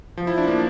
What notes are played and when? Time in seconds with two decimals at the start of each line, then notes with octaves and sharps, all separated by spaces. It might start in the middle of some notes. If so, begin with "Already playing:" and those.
0.17 F3
0.27 E4
0.38 D4
0.48 A#3